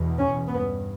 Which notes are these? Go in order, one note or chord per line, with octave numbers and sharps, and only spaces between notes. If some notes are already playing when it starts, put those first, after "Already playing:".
Already playing: E2 B2
C#4
G2 B3